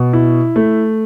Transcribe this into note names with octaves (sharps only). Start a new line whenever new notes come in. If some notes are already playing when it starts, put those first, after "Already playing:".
Already playing: B2
E4
A3